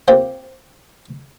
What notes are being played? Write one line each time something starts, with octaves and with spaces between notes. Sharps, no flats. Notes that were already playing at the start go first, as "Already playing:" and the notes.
A#3 C4 F4 G4 C5